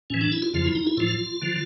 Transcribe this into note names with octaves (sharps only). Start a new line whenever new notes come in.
A2 E3 C#4
D4
E4
F4
F2 C#3 F3 F4
E4
D#4
E4
A2 F3 F4
D3 F3